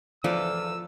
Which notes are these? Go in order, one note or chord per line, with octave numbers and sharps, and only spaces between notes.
E2 F3 F4 A4 C5 D5 E6